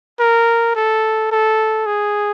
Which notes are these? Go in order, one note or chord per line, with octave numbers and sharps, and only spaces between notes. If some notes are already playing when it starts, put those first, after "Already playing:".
A#4
A4
A4
G#4